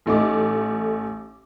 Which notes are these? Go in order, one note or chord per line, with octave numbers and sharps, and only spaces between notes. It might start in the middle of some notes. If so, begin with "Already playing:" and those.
A1 A3 D#4 D6